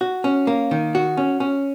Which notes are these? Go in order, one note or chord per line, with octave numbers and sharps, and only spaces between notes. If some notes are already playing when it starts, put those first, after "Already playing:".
F#4
C#4
A#3
D#3
F#4
C#4
C#4